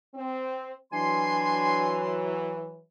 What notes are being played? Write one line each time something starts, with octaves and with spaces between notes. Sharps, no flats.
C4
E3 F#3 D4 G#5 C6